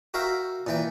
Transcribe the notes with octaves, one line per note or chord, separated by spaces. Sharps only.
F#4 A#4 E5 F5 G5
A#2 E3 G5